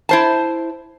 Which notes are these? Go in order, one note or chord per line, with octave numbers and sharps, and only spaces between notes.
E4 C5 A5